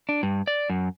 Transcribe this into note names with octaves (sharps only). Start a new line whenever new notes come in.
D4
G2
D5
F#2